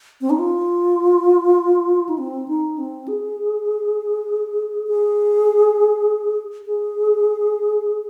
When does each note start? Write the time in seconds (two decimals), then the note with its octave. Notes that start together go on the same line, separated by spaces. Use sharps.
0.21 C4
0.30 D#4
0.39 F4
2.09 D#4
2.18 C4
2.48 D#4
2.78 C4
3.08 G#4
4.87 G#4
6.66 G#4